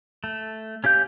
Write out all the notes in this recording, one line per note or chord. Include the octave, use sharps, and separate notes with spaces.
A3
C#4 G4 F5 G6